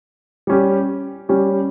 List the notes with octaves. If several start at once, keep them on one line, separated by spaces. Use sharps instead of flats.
G3 C#4 G4
G3 C#4 G4